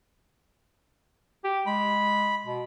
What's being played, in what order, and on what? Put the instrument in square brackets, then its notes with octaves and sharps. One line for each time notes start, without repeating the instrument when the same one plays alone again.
[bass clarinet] G4
[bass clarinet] G#3 [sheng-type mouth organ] B5
[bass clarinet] B2